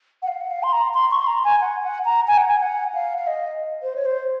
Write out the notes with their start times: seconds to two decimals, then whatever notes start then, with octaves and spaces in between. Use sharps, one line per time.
0.22 F#5
0.28 F5
0.41 F#5
0.50 F5
0.63 C6
0.73 A#5
0.94 C6
1.11 C#6
1.19 C6
1.27 A#5
1.44 G#5
1.61 F#5
1.83 F#5
2.05 A#5
2.28 G#5
2.38 F#5
2.48 G#5
2.61 F#5
2.94 F5
3.17 F5
3.27 D#5
3.82 C5
3.96 C#5
4.05 C5